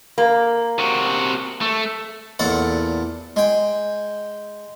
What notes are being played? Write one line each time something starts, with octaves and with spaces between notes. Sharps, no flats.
A#3
C3 F#4
A3
E2 A#2 A4 F#5
G#3 G5